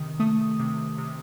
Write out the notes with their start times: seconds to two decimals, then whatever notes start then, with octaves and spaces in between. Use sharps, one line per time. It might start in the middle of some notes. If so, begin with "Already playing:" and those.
Already playing: C3 D#3 D#6
0.20 A3 D#6
0.60 C3
0.98 C3